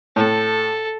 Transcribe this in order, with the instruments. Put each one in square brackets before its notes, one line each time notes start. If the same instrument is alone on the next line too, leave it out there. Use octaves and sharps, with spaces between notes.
[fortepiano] A2 [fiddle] A4